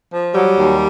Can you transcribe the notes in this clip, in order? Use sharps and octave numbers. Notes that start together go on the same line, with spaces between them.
F3
F#3 G3
D#2